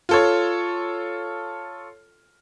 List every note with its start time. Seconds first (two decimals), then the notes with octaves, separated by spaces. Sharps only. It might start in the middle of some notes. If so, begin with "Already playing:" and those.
0.09 F4 A4 C#5